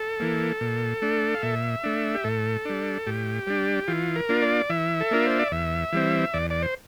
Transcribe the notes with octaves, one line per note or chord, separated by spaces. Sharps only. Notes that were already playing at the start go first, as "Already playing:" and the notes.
Already playing: A4
E3 A#3
A#2
A3 D4
F5
A#2 E5
A3 D4
G4
A2 A4
G3 D4
A2 G4
G3 D4
E3 F4
A#4
A#3 D4 F4
D5
E3 E5
A4
A#3 D4 F4 A#4
C5
D5
E2 E5
E3 G3 C4
E2 D5
D5
C5